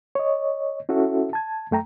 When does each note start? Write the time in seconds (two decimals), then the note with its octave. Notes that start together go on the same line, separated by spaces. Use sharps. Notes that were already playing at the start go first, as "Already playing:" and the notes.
0.15 C#5 D#5
0.89 C#4 E4 F#4 A4 E5
1.33 A5 G#6
1.71 F#2 A3 G5 A#5